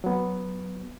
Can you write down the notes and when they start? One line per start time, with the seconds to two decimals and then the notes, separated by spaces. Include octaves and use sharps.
0.04 F#3 B3